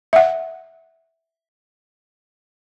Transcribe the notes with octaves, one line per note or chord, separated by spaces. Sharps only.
E5 F#5